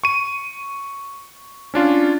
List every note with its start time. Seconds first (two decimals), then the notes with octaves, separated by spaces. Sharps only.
0.04 C#6 D#7
1.74 C#4 D4 F4